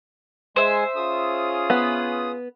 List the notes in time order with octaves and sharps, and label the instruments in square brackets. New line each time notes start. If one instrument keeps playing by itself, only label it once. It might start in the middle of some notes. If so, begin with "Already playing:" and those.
[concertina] G#3 G#5 [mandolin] C5 E5
[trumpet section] C#4 F4 G#4 [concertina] D#6
[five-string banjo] B3